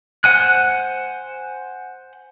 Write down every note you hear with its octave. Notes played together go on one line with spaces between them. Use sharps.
C5 F#5 G#5 F#6